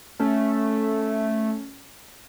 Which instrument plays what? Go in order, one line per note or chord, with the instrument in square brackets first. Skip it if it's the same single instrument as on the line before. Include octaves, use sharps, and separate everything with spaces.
[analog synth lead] A3 [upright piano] C#4